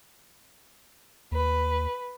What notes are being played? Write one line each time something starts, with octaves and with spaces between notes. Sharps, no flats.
D#2 B4